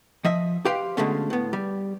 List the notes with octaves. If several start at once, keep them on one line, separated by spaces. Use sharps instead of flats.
F3 D#5 E5
G4 B4 C5 F5 G5
B2 D3 G#3 A3 C#4
A2 B3
G3